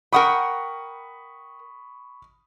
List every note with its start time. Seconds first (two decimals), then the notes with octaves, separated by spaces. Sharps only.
0.13 A#4 F#5 G5 B5 C#6 D#6